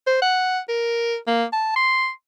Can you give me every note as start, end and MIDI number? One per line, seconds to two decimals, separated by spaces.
0.07 0.21 72
0.22 0.59 78
0.68 1.17 70
1.27 1.45 58
1.53 1.74 81
1.76 2.09 84